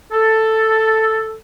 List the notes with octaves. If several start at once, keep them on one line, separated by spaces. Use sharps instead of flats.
A4